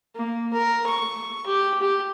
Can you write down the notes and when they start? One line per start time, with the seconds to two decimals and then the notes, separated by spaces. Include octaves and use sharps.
0.15 A#3
0.53 A#4
0.86 C#6
1.46 G4
1.81 G4